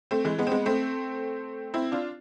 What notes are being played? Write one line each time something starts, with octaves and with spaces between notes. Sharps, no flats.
A3 C4
E3 G#3
G#3 B3
C4
G#3 B3
A3 C4
C4 E4
D4 F4